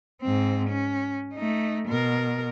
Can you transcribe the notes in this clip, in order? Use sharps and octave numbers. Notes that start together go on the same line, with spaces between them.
G#2 C4
C#4
A3 D#4
B2 A#4